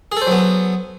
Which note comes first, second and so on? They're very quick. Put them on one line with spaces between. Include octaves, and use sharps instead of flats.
G#4 A4 C5 F#3 B3